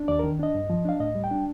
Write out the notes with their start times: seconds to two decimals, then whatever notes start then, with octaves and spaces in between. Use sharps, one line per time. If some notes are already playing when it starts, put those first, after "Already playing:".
Already playing: D4
0.08 D#2 D5
0.19 D#3 A#4
0.39 D4 D#5
0.55 G2
0.70 F3
0.85 D4 F5
1.00 A2 D#5
1.15 G3
1.24 G5
1.31 D4